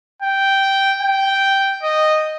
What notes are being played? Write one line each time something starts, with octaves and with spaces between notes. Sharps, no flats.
G5
G5
D#5